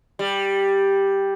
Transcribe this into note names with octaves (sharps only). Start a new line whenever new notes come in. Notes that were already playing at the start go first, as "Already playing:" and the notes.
G3